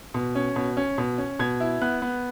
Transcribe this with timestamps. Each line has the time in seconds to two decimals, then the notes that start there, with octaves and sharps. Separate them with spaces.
0.14 B2
0.35 C#4
0.56 B2
0.77 C#4
0.98 B2
1.18 C#4
1.39 B2 G#6
1.60 E4
1.81 B3 F#6
2.02 B3